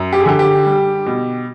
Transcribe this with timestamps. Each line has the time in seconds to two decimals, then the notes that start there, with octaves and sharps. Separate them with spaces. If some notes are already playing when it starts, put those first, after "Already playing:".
Already playing: F#2
0.13 G4
0.20 G#4
0.26 D3 G4
0.39 G4
0.66 G3
1.06 B2